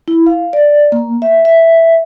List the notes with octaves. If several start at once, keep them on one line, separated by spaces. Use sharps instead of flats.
E4
F5
D5
A#3
E5
E5